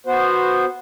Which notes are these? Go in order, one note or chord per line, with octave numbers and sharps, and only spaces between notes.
B3 F#4 C5